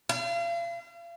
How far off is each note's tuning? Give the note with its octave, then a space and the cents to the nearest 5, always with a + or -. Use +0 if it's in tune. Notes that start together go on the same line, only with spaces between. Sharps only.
F5 -40